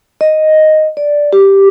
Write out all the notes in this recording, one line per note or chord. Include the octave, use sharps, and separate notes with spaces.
D#5
D5
G4